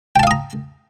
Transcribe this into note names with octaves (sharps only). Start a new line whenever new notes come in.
F5 G5 A5 A#5 D#6